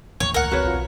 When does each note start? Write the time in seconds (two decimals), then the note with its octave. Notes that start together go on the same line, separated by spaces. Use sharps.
0.20 A1 D#2 C#5
0.34 C#2 A#4 F#5
0.51 E1 C4 F#4 B4 C#5
0.65 B1 F4